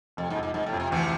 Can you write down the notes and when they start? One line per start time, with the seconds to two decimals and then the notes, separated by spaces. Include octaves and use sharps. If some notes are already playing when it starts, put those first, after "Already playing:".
0.17 F1 F2
0.30 G#2
0.36 F2
0.43 G#2
0.54 F1 G#2
0.66 A2
0.73 F2
0.80 C3
0.91 D2 C3 E3